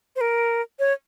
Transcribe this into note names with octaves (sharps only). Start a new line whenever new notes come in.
C5
A#4
C#5